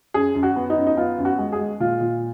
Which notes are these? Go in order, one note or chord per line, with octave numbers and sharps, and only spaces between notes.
F#2 G#4
F#2
F#4
B3
D#4
F#2
D#4
B3 F4
F#2
F#4
G#3
G#4
G#3
A#2 F4
A#2